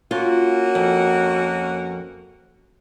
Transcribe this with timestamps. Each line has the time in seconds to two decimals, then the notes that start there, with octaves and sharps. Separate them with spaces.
0.11 A#3 C#4 F4 F#4
0.75 F2